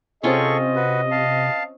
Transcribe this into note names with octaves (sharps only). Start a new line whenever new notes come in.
C3 C4 C#4 F4 G#4 A4 D#5 C#6
F#4 B4
F5 A5